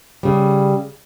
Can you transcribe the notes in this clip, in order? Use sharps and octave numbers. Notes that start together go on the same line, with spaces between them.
C#3 G3